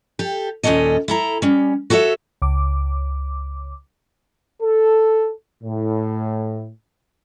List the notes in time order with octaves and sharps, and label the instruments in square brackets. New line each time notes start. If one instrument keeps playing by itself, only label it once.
[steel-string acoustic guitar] G4 A4
D#2 A#2 E3 C#4 A4 D#5
E4 A4 A#5
G3 C#4
F#4 A4 C#5 D#5 E5
[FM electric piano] C#2 D6
[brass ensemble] A4
A2